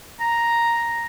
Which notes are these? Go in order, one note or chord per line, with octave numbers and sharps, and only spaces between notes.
A#5